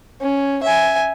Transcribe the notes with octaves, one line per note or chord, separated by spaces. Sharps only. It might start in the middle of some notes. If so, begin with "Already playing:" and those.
C#4
E5 G#5